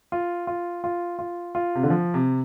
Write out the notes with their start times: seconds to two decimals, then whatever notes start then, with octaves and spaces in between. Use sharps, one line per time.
0.12 F4
0.47 F4
0.84 F4
1.19 F4
1.55 F4
1.75 C3
1.83 D3
1.90 F3
2.14 C3